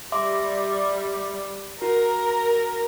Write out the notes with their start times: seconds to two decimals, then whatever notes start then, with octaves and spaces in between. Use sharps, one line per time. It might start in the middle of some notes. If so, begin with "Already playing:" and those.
0.12 G3 E5 C6 D6
1.82 F#4 A#4